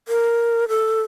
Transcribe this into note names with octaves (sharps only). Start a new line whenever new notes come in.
A#4
A4